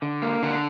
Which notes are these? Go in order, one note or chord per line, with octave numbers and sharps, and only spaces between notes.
D3
A#3
D3